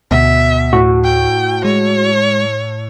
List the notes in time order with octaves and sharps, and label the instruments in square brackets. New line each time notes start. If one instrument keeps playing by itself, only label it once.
[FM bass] D2 [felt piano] B2 [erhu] E5
[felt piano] A2 [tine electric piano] F#4
[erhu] G5
[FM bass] G#3 [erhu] C#5